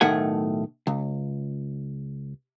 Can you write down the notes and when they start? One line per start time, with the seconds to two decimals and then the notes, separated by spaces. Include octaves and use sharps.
0.01 B1 A2 D#3 A3 F#5 G#5
0.87 C#2